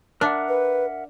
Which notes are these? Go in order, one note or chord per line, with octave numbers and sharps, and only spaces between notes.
D4 A#4 E5 F#5
B4